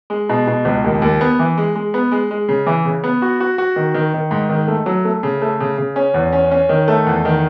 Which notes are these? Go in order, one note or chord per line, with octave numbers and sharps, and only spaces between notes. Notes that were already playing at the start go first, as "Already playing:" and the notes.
G#3
B2
B2
C#2
D#2
D#2
B3
E3
G#3
G#3
B3
G#3
G#3
C#3
E3
C#3
B3
F#4
F#4
F#4
D#3
D#3
D#3
G#2
D#3
A3
F#3
A3
C#3
A3
C#3
C#3
C#4
E2
C#4
C#4
D#3
A3
E2
D#3